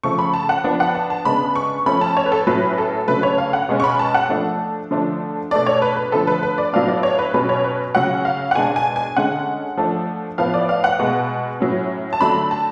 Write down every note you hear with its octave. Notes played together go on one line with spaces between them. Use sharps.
C#3 F3 A3 C#6
B5
A5
F#5
F3 B3 D4
F#5
A5
A5
C#3 G#3 B3 D4 B5
C#6
F3 A3 C#4 B5
A5
C#5
B4
A4
A2 F#3 C#4 B4
A4
C#3 F#3 A3 D4 B4
C#5
F5
F#5
B2 G#3 C#4
C#6
B5
A5
F#5
F3 A3 D4
D3 F3 A3 D4
B2 A3 D4 D5
C#5
B4
B4
D3 F3 A3 A4
B4
B4
D5
A2 F#3 B3 D4 F5
D5
C#5
B4
B2 F#3 C#4 B4
C#5
B4
C#3 F#3 C#4 F#5
F5
F#5
B2 G#3 D4 G#5
G#5
G#5
D3 G#3 C#4 F#5
F3 A3 D4
A2 F3 B3 F5
D5
F5
F#5
B2 G#3 B3
A2 F#3 C#4
A5
D3 F#3 A3 D4 B5
A5